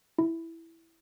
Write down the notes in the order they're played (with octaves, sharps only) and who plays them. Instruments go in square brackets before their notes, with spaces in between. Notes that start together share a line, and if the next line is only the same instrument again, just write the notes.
[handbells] E4